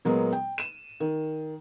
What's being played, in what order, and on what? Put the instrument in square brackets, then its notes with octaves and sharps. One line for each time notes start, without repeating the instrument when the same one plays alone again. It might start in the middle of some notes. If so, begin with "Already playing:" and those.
[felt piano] A#2 F#3 G#3 A#3 B3
G5
D#7 E7
D#3